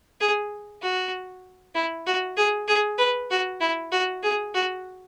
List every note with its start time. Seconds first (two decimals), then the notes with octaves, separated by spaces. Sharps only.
0.20 G#4
0.82 F#4
1.75 E4
2.06 F#4
2.37 G#4
2.68 G#4
2.98 B4
3.30 F#4
3.61 E4
3.92 F#4
4.23 G#4
4.54 F#4